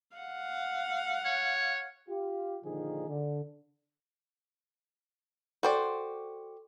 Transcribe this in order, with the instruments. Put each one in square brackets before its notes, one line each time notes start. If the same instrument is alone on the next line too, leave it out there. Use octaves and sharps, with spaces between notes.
[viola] F5 F#5
[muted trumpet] C#5
[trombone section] F4 G4
A#2 D3 D#3 F3 D#4 G#4
D3
[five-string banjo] F#4 C5 D5 [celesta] A4 G5 D6